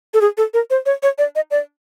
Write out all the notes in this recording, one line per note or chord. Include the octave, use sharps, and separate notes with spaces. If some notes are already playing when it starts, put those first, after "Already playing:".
A4
G#4
A4
A#4
C5
C#5
C#5
D5
D#5
D5